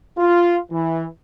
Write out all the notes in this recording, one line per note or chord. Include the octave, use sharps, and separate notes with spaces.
F4
E3